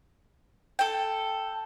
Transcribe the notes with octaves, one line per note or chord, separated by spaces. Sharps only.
A4 G5